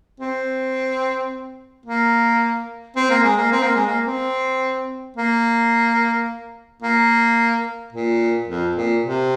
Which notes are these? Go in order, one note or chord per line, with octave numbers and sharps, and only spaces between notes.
C4
A#3
C4
A#3
G#3
A#3
C4
A#3
G#3
A#3
C4
A#3
A#3
A#2
F2
A#2
C3